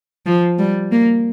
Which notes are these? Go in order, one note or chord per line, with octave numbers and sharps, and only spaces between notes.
F3
G3
A#3